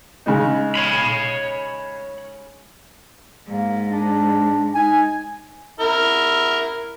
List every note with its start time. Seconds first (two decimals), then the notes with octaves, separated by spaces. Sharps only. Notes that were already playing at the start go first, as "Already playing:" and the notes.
0.26 C#3 G#3 D#4
0.75 C#5 B5
3.46 G#2 A#3
3.91 D4
4.74 D#4 G#5
5.80 E4 A#4